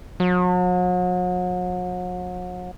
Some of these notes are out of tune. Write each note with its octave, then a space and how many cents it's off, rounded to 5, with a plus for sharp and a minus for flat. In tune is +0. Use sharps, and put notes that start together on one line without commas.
F#3 -40